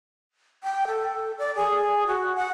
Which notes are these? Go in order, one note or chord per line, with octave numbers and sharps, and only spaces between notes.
G5
A4
D5
G#4
F#4
F#5